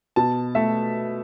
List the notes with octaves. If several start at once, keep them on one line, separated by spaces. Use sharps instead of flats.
B2 A5
A3 E5